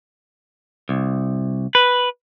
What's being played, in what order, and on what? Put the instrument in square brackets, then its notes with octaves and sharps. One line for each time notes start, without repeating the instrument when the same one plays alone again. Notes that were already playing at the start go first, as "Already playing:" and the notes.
[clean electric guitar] C2
B4